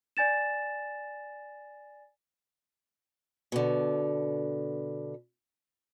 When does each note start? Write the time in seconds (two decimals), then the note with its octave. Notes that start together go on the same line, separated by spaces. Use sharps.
0.17 D5 G#5 A6 E7
3.52 B2 D3